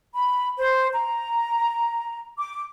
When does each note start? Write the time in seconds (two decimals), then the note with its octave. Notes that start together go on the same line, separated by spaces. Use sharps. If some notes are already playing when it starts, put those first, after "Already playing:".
0.15 B5
0.59 C5
0.94 A#5
2.39 D6